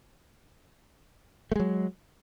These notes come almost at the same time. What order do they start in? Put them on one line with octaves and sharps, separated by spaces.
A3 G#3 F#3